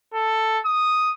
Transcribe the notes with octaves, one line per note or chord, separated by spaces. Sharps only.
A4
D#6